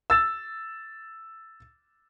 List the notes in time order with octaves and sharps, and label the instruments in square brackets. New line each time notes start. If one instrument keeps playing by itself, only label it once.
[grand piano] E6 A6 E7